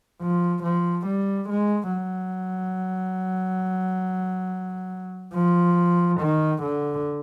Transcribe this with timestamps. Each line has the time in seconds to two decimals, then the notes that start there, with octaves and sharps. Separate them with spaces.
0.21 F3
0.63 F3
1.06 G3
1.49 G#3
1.92 F#3
5.35 F3
6.20 D#3
6.63 D3